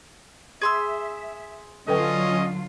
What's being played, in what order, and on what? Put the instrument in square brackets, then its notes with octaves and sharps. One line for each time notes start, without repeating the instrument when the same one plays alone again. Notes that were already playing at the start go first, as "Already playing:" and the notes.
[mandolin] G#4 C6 E6 [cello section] E5
[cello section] D3 F#3 F4 [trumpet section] C#4 D#5 [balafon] A4 B4 G5